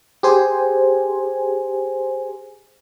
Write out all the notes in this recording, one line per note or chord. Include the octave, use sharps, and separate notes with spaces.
G4 G#4 C5 G#5